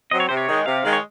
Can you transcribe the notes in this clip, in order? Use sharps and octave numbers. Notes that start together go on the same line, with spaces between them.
F#3 C4 D#5
C#5
C3 C5
C#5
D#3 G#3
C3 F5
D#3 G#3
C#5